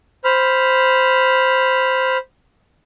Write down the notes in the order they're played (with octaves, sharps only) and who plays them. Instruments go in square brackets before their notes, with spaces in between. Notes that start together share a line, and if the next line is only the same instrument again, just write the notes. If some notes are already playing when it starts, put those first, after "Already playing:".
[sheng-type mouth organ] C5 B5 F6